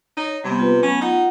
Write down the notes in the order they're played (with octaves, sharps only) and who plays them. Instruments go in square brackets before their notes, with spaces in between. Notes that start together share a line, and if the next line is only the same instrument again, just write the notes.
[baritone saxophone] D#4 [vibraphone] C#5
[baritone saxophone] C3 [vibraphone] G3 A#3 B3
[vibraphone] F4 B4
[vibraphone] F#3 A3 B3 [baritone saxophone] C#4
[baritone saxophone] D#4 [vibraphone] F4 F#5